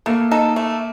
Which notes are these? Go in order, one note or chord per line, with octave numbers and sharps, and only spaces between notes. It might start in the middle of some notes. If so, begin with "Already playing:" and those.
A3 A#3
D#4 A4
A3